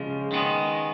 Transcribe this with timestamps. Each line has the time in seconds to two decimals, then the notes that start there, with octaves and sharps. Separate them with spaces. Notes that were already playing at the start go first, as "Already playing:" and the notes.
Already playing: C#3 F3 G#3
0.31 D#3 G#3 B3